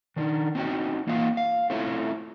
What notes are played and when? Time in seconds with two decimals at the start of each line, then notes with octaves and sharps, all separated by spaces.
0.16 D#3 D4 D#4
0.55 C4 C#4 D#4 F#4 C#5 G5
1.07 E3 A#3 D#4 F4 F5
1.37 F5
1.70 A3 C4 C#4 E4 F4 C#5